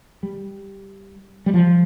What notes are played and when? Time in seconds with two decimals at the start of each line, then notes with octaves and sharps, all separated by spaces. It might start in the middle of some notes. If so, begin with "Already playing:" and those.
0.23 G3
1.46 G3
1.54 F3